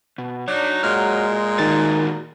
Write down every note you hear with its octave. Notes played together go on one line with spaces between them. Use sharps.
B2
D4 D#4 F#4 C#5
A#2 G#3 F6
D#3 D#4 F#4 A#4 A6